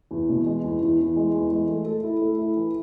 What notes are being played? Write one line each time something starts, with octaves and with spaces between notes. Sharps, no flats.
E2
B2
G#3
E2
E2
E2
G#3
E2
G#3
A3
A4
E4
A3
E4
E3